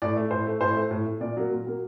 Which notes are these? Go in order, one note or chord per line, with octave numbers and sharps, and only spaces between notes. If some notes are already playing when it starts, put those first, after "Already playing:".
A2 D5
A3
A2 C5
A3
A2 C5
A3
A2
A3
A#2 D5
F#3 A#3
A#2
F#3 A#3